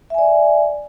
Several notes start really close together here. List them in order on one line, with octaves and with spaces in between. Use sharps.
E5 G#5 D5